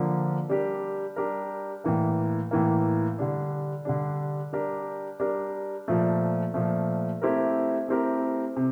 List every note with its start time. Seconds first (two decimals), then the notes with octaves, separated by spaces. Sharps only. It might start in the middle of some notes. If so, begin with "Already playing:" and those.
Already playing: D3 F3 A#3
0.49 G3 D4 G4 A#4
1.16 G3 D4 G4 A#4
1.84 A2 E3 A#3
2.51 A2 E3 A#3
3.19 D3 G3 D4
3.85 D3 G3 D4
4.53 G3 D4 G4 A#4
5.20 G3 D4 G4 A#4
5.88 A#2 F3 A3
6.54 A#2 F3 A3
7.22 A3 C4 E4 G4 A#4
7.88 A3 C4 E4 G4 A#4
8.56 C3